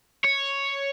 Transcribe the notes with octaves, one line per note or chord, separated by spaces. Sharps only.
C#5